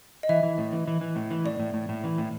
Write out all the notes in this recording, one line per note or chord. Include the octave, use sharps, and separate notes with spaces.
D#5
E3 E5
E3
A2
E3
E3
E3
A2
E3
A2 D5
A2
A2
A2
E3
A2